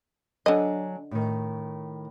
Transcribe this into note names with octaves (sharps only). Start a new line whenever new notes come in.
D3 F#3 D4 D#5 G#5
A2 D#3